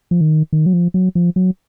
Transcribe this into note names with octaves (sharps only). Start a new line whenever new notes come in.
F3
D#3
D#3
F#3
F3
F#3
F3
F#3